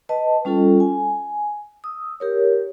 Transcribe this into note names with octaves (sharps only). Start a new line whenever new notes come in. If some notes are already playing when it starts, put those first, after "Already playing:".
B4 D#5 A5
G3 C#4 F4 A4
G#5
D#6 E6
G4 A#4 C#5